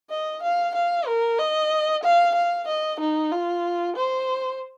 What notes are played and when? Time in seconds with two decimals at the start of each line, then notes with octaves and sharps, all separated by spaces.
0.10 D#5
0.43 F5
0.75 F5
1.07 A#4
1.39 D#5
2.04 F5
2.35 F5
2.68 D#5
3.00 D#4
3.32 F4
3.96 C5